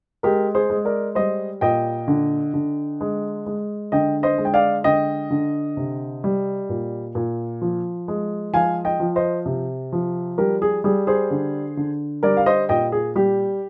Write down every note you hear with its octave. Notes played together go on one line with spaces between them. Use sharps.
G#3 G4 A#4
G#4 C5
G#3
A#4 D5
G3 C5 D#5
A#2 D#5 G5
D3
D3
G#3
G#3
D3 D#5 G5
C5 D#5
G#3
G5
D5 F5
D3 D#5 G5
D3
C3
G3
A#2
A#2
F3
G#3
F3 F5 G#5
D#5 G5
F3
C5 D#5
C3
F3
G3 G4 A#4
G#4
G3 G#4
G#4 C5
D3
D3
G3 A#4 D5
F5
C5 D#5
A#2 D#5 G5
G#4
G3 G4